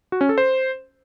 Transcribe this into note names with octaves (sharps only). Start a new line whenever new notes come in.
F#4
C#4
A4
C5